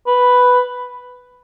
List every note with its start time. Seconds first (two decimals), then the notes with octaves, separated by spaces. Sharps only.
0.07 B4